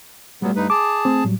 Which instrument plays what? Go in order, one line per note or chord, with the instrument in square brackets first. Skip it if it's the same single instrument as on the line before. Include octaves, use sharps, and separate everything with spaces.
[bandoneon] A#2 F#3 B3 [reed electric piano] G3 A3
[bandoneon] G2 D#4 B4
[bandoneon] G#4 A5 [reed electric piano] D6
[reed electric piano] A3 C4
A2 F#3 G3